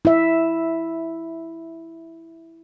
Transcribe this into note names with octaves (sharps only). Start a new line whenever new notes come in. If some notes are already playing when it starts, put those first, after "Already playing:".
E4 E5